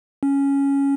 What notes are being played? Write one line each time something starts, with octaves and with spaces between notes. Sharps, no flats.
C#4